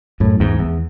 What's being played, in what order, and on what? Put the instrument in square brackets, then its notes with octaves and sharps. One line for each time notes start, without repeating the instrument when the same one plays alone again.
[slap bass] F#2 A2
E2 G#2
E2